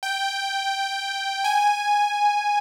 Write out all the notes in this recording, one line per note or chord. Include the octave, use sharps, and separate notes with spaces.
G5
G#5